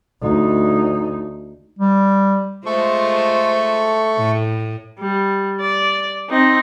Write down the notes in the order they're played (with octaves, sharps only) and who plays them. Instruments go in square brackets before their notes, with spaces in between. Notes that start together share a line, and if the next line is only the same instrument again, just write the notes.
[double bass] D2 D#4
[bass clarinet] G3
[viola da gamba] G#3 F4 C5 [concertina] A3 A4 C#6
[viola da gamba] A2
[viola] G3
D5
C4 D#4